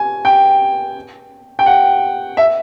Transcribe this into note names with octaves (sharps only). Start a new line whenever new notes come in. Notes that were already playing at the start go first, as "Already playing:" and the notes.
Already playing: G#5
G5
G5
F#5
E5